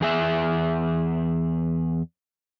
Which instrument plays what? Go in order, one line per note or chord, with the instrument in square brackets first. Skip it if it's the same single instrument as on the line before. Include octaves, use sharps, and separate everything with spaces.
[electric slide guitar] E2 G#4 E5